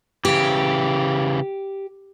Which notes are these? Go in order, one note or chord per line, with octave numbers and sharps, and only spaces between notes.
C#3 E3 G4